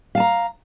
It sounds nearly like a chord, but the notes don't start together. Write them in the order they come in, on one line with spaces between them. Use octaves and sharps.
F5 A5 A#5